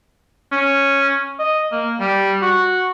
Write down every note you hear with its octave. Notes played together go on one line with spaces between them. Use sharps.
C#4
D#5
A#3
G3
F#4